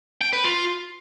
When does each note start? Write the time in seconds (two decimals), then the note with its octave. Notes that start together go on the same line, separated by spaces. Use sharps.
0.21 G5
0.33 B4
0.44 F4